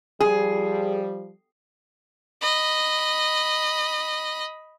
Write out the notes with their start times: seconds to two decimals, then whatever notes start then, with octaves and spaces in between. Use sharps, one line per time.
0.21 F3 G3 G#4
2.42 D#5 B5